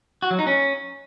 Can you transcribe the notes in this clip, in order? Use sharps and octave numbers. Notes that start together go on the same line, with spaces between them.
F#4
F#3
D#4
C#4